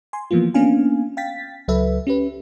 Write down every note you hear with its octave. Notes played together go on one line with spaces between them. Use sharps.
G#5 C6
E3 F3 A#3 B3 F4
A#3 B3 C#4 D4 F5 G#5
F5 G5 A6 B6
C#2 F#3 A4 B4 E5
C#4 G4 B4